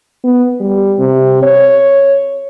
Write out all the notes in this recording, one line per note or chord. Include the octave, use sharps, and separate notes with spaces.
B3
G3
C3
C#5